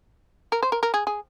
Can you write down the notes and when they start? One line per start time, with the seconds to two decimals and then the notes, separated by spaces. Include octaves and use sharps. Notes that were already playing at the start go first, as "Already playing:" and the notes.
0.52 A#4
0.63 C5
0.72 A#4
0.83 A#4
0.94 G#4
1.07 G#4